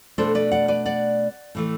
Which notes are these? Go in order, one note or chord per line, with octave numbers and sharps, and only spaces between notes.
B2 A3 D4 A4 C5
B4 D5
D5 F#5
B4 D5
D5 F#5
A2 E3 A3